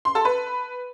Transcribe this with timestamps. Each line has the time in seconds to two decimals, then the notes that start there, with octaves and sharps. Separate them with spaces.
0.05 C6
0.15 A4
0.25 B4